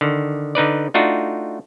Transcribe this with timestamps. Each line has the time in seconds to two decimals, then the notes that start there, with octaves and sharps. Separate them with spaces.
0.01 D3 D#3
0.55 D3 D#4 B4 D5
0.94 A3 D4 D#4 F4 F#4